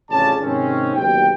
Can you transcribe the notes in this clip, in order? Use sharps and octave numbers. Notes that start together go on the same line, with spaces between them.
A1 F2 C#3 C#4 D5 A5
G#2 C3 D#3 G#3 C4 C#4
F#1 D#2 B2 G4 G5